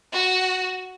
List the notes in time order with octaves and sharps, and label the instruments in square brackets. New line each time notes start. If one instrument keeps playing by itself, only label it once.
[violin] F#4